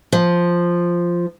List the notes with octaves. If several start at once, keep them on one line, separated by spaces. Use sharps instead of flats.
F3